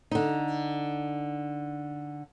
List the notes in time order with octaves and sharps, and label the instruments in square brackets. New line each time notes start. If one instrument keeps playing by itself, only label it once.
[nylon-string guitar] D3 D#4